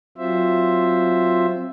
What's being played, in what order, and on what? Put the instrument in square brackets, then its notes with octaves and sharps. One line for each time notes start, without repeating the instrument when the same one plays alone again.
[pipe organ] F#3 C4 F4 C5 E5